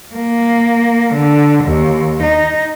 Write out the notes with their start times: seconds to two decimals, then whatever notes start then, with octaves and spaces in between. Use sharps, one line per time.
0.15 A#3
1.14 D3
1.64 D#2
2.23 D#4